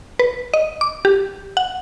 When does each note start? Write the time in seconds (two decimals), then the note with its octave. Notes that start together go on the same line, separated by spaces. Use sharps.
0.19 B4
0.54 D#5
0.81 D6
1.05 G4
1.57 F#5